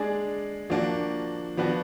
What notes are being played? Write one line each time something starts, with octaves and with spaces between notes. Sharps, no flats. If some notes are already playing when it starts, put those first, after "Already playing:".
Already playing: G#3 D4 G#4 D5
F3 A#3 D4 F#4
F3 B3 D4 F#4